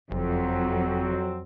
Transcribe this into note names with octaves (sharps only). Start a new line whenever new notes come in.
F#1 F2 F#3 C4